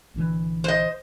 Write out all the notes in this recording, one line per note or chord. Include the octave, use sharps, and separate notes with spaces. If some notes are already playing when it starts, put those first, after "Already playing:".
A#1 D3 E3
C5 D#5